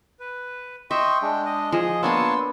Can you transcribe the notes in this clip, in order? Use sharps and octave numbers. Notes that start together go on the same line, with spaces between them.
B4
D#5 E5 G5 C6 C#6
G#3 D4
D#5
F3 G#4 D#5
A#3 B3 D4 C#5 G#5 A5 C6 E6